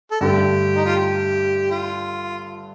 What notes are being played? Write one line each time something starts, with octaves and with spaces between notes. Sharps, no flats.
A4
G2 D3 A3 G4
D#4
F4
G4
F4